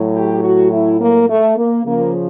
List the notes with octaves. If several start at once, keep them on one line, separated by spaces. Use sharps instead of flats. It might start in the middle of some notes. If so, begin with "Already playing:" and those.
Already playing: A2 F#3
G4
F#4
E4
A#3
A3
A#3
C#3 F3 A#3